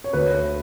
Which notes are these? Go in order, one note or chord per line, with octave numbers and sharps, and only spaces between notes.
C#5
D2 B4